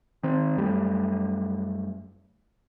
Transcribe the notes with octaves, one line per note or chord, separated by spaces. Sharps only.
D#3 C4
F#2 G3 A3